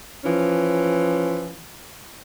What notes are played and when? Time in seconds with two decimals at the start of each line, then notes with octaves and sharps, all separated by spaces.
0.24 E3 F3 C#4